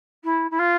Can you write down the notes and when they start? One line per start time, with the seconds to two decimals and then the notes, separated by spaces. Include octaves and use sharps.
0.24 E4
0.51 E4
0.59 F4